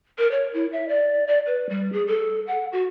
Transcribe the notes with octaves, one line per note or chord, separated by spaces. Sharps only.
A#4
C#5
E4
E5
D5
D5
B4
G3
G#4
A4
F#5
F#4